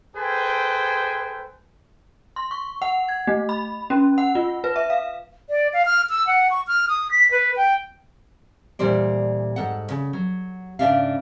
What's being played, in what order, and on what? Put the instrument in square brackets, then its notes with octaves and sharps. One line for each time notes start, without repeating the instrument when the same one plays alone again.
[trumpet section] G#4 A4 B4 C5 G5 G#5
[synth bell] C6
C#6
F#5
G#6
A3
B5
C#4
F#5
F4
B4
E5
F5
[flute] D5
F5
F6
E6
F#5
C#6
F6
D#6
B6
B4
G5
[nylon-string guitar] D2 A#2 E3 G3 C5 D5
G#2 A4 F#5
C#3
F#3
G#2 C#3 A3 D4 E5 F5